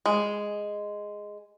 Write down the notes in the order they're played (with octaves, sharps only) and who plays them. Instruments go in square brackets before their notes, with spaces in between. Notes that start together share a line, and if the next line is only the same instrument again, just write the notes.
[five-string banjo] G#3